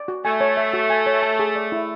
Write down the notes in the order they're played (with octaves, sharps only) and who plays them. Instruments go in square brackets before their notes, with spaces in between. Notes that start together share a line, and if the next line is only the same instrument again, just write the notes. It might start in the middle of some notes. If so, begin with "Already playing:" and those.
Already playing: [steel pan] D5
F#4
[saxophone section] A3 [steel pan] G#5
[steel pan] C#5
E5
F#4
G#5
C#5
A5
G#4
D5
E4